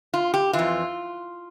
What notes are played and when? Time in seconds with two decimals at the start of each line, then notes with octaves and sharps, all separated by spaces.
0.14 F4
0.34 G4
0.53 E3 F4
0.59 F2